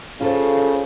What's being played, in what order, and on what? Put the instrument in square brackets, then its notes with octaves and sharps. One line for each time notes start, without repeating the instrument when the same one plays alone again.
[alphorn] C#3 [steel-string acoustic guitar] F4 A4 C5